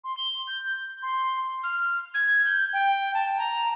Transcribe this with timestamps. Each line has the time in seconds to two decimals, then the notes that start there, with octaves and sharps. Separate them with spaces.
0.04 C6
0.17 G7
0.47 G6
1.02 C6
1.63 F6
2.14 G#6
2.45 G6
2.73 G5
3.14 A5
3.38 A#5